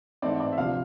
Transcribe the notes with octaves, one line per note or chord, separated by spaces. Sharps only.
G#2 E3 A3 C4 D5
D5
E5
D2 C3 F3 F5